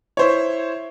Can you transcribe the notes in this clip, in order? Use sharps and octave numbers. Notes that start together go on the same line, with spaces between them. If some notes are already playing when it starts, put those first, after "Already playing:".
E4 C5 C#5